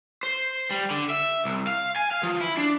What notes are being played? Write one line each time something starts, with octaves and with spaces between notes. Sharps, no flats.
C5
G3
D3
E5
C2
F5
G#5
F5
F3
E4
D4